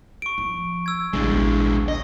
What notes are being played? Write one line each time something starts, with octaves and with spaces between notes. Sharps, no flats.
C#6 D7
F3
E6 G#6
A1 D2 G#3 D4
D#5